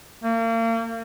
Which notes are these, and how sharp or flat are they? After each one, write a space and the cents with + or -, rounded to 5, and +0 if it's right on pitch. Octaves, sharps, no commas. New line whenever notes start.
A#3 -35